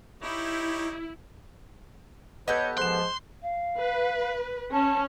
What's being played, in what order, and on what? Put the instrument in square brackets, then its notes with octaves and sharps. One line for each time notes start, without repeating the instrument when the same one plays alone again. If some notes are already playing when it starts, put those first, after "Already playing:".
[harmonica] D#4 G4 C#5 [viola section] E4
[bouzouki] B3 G4 A4 [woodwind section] B4 C#5 [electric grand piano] D#5 G6
[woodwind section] G#2 F3 [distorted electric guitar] C6 [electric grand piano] F#6 E7
[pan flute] F5
[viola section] B4
[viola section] C#4 [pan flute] A5